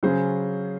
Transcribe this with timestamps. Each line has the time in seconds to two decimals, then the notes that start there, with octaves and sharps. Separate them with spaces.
0.03 C#3 F#3 C#4 G#4 C5